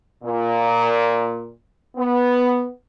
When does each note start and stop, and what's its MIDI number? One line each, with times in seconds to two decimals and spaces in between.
0.23 1.49 46
1.96 2.67 59